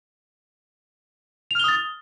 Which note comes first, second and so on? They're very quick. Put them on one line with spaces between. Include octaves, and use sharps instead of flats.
F7 F6 G7 D#6 A6